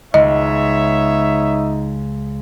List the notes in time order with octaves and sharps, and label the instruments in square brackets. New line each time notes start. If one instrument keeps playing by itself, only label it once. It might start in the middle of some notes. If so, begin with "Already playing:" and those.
[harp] C#2 [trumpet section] B3 C#5 E5 [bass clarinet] D#4 [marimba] D#5